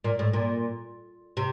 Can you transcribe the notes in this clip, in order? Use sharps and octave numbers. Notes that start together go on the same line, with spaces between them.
A#2
A2
A#2
C3